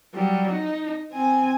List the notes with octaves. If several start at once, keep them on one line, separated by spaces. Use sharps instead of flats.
F#3 G3
D#4
C4 G#5